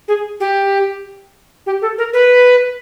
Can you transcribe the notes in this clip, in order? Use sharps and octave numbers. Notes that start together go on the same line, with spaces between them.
G#4
G4
G4
A4
A#4
B4